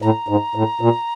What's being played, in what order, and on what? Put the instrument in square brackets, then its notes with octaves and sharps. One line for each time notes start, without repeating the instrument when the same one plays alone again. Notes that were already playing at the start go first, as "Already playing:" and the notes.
[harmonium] A2 [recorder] A#5
[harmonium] G#2
A2
A#2